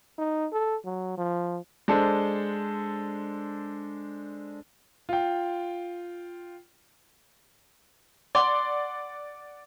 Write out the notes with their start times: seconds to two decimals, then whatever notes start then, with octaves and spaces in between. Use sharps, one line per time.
0.18 D#4
0.52 A4
0.85 F#3
1.17 F3
1.88 G#3 D4 A4 C5
5.09 F4 G5
8.35 D5 F#5 C6